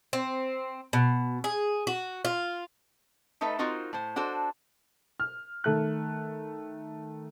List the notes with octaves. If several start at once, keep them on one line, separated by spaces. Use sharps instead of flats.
C4
B2
G#4
F#4
F4
A3 D#4 A4 B4 E5
C4 D#4 F4 F#4 A#4 C5
A2 C5
D4 F#4 A4 C5
F6
D#3 A3 F#6